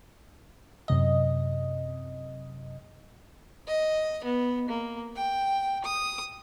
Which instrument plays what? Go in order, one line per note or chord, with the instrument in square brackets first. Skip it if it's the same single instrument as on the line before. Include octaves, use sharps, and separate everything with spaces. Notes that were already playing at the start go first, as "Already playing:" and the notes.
[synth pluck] F#2 C3 D#5
[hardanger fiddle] D#5
B3
A#3
G5
D#6